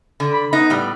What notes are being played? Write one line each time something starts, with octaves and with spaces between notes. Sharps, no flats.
D3
B5
B3 D#4
A2 G3